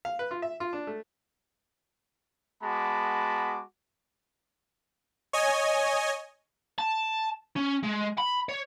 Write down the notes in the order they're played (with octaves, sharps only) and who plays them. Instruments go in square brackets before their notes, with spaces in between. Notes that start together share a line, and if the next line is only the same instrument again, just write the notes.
[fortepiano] F5
B4
F4
E5
F4
D4
A3
[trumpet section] G#3 B3 F#4 A5 B5 D6
[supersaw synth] C#5 D#5 G#5
[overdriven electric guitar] A5
C#4
G#3
B5
C#5